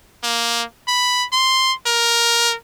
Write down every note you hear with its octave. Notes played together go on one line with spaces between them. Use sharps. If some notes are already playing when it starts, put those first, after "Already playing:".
A#3
B5
C6
A#4